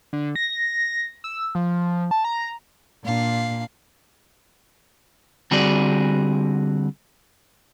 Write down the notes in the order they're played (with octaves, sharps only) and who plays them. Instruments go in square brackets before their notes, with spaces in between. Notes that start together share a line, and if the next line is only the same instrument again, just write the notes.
[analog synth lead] D3
A#6
E6
F3
A5
A#5
[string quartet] A#2 [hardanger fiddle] D4 F5
[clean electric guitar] D3 G3 C4 F#4 G#4 D5